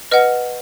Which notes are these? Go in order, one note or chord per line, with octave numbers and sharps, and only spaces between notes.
B4 D#5 F#5 F6